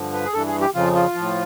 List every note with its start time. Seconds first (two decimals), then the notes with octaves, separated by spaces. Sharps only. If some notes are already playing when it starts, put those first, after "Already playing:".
Already playing: G2 D3 F3
0.13 B4
0.25 G#4
0.33 G2 E3 A4
0.47 G#4
0.61 G4
0.74 F2 C#3 F3 F4
0.95 F4
1.15 A2 F3